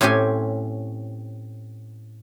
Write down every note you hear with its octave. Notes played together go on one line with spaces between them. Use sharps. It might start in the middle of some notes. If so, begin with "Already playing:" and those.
A2 C4 C#4 G4 G#5